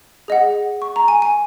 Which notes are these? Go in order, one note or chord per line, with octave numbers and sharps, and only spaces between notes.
G#4 D#5 F#5
C#6
A#5
G#5
G#5